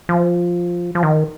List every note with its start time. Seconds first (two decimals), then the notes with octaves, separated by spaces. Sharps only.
0.09 F3
0.95 F3
1.03 D#3